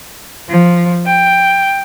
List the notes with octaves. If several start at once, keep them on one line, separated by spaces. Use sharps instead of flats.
F3
G5